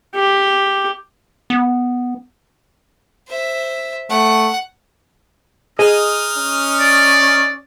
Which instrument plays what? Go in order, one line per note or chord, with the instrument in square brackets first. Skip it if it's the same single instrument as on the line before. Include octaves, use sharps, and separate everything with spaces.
[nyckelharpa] G4
[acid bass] B3
[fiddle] C5 E5
[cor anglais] A3 [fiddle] F#5
[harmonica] D#4 D#6 F6 [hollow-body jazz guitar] G#4 D#5
[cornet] C#4
[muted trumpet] D5